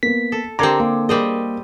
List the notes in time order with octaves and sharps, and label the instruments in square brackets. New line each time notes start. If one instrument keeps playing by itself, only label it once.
[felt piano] A#3 B3 [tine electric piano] B6
[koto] A4
[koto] D3 C4 [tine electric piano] G4 A#4 A#5 [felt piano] D6 G#6 C7
[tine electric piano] A#3
[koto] G3 C4 D#5 [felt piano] G#4 A#4